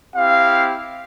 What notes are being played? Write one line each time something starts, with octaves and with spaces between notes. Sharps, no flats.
C4 E4 G4 F5